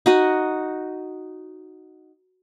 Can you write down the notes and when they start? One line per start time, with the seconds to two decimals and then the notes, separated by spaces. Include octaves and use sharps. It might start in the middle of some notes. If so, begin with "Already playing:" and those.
0.06 D#4 F#4 D#5